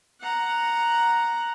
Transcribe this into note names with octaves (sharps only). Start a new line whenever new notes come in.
F#5 A#5